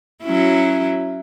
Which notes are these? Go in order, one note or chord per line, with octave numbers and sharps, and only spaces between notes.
F#3 C#4 E4